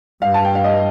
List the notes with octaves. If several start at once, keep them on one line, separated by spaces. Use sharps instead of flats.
G2 F5
A5
G5
F5
D#5